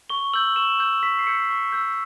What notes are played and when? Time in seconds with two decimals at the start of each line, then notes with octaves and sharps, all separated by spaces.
0.10 C#6 G7
0.33 E6 G6 F#7
0.56 C#6 E7
0.79 E6 G6
1.03 C#6 B6
1.19 C7
1.27 E6 G6 C#7
1.50 C#6
1.72 E6 G6